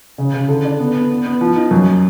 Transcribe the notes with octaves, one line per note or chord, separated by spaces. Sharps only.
C#3
C#3
D3
D4
B3
B3
B3
B3
F3
D#4
F#2